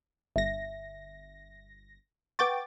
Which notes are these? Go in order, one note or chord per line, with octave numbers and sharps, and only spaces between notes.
G1 E5 A#6
B4 F#5 G5 C#6 D6 A6